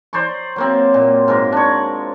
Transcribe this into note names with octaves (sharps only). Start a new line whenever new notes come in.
C5 D5 A#5 C#6
F#3 A#3 C4
A#2
G#2 F4 A#4
D4 C#5